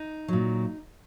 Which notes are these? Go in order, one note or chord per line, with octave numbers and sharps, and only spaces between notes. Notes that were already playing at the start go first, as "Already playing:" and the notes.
Already playing: D#4
A#2 F#3